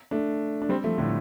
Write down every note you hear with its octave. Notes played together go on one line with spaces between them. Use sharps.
A3 D4
D4
G3 C4
F3 A3
A2 D3